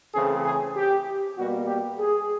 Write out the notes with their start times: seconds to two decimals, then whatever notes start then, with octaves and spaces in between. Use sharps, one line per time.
0.14 C#3 E3 A3 C4 G#4
0.45 G#4
0.76 G4
1.37 B2 G3 A#3 F#4
1.67 G4
1.99 G#4